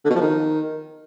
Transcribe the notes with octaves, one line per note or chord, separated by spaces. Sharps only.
D3
B2
F3
D#3